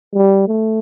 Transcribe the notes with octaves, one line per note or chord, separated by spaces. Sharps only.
G3
A3